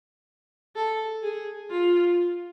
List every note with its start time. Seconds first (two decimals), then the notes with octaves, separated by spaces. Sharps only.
0.76 A4
1.23 G#4
1.71 F4